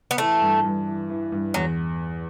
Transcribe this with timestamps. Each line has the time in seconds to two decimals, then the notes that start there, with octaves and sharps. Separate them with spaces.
0.11 B3
0.18 E3 A3
0.41 G2
0.64 G2
0.87 E3
1.10 E3
1.32 G2
1.54 E2 F#3